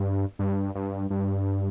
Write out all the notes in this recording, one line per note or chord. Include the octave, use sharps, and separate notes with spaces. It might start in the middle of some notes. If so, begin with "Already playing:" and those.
Already playing: G2
G2
G2
G2